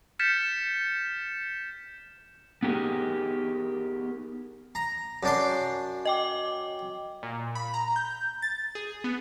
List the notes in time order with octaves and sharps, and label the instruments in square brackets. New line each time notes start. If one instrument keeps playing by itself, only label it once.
[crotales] F6 G6 A6 B6 C#7 E7
[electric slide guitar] B3 D#4 G4 G#4 A#4
[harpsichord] A#5
F#2 D4 C6
[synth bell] D#5 G5 D6
[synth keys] A#2
B5
A#5
G6
A6
G#4
B3